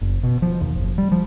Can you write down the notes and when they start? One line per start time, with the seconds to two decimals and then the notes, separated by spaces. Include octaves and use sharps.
0.01 F#1
0.23 B2
0.42 F3
0.61 D#2
0.76 F#1
0.98 G3
1.12 F3